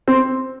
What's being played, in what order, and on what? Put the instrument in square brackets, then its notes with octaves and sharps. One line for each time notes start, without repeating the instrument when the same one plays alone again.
[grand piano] C4